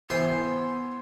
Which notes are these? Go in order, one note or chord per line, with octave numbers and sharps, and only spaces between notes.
E3 B3 C5 G5 G#5 C6